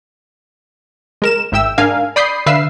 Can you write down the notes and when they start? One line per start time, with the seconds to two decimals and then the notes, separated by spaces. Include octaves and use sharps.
1.22 G#3 A#4 E7
1.52 G#1 G#2 E5 G5 E6
1.78 G#2 D4 A#4 F5 G#5
2.16 D5 B5 D#6 G6 C7
2.46 D3 B4 E5 F5 E6 C7